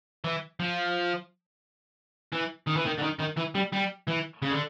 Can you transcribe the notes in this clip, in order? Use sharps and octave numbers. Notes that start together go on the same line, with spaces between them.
E3
F3
E3
D#3
E3
D#3
D3
D#3
D#3
E3
G3
G3
E3
C#3
D3